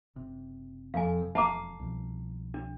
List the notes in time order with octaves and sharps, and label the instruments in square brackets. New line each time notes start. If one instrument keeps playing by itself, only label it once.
[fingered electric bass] F#1 C3
[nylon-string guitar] F2 [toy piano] F5 G#5
[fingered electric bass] E1 F2 [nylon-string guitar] F5 [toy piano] A5 A#5 D6
[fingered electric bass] C2 B2 F3
[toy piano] D4